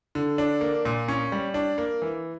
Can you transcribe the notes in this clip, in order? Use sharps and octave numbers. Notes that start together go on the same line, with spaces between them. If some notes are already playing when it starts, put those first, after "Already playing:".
D3
D4
A#3
A#2
C#4
G3
D4
A#3
E3